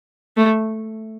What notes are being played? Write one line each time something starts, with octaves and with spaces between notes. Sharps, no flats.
A3